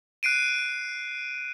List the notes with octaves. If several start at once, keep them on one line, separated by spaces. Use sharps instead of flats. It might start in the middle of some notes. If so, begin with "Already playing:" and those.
F#6 C7 D7 D#7